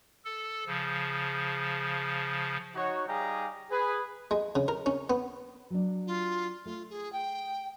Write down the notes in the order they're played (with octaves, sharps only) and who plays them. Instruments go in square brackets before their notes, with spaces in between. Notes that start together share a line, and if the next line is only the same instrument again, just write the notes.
[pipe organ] A4
C#3 F3
[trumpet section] D#4 F#4 C#5
G3 D#4 G4 G#4 F5 A#5
G#4 B4
[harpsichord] G#3
C#3
A#4
C#4
B3
[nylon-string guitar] F#3 D4
[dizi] F4
[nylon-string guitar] A3 [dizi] F4
[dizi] G#4
G5